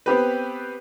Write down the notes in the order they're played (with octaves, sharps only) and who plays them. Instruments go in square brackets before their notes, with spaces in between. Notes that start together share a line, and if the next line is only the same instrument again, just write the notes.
[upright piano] B3 C4 G4 B4